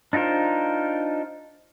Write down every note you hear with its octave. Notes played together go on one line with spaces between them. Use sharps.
D4 D#4 F4 A#4 C5